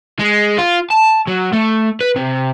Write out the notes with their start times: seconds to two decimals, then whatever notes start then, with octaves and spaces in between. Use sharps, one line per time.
0.19 G#3
0.58 F4
0.90 A5
1.27 F#3
1.53 A3
2.01 B4
2.16 C3